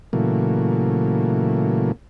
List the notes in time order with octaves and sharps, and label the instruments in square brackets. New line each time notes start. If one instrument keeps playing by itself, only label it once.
[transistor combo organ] A#2 C#3 E3 F#3 A3 A#3